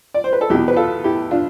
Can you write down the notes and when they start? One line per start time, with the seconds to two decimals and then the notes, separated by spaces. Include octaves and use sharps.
0.14 D5
0.24 C5
0.33 B4
0.41 A4
0.50 E2 E4 G4
0.54 B2
0.68 B4
0.76 F4 A4
1.04 E4 G4
1.31 D4 F4